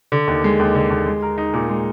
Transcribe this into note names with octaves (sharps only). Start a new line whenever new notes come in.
D3
D#2
G#3
D#2
D3
D#2
G#3
A#4
D#4
A#2
G#3